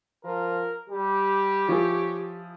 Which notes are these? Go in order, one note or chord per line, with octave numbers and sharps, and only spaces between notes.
F3 A#4
G3 G4
F3 E4 G#4 C#5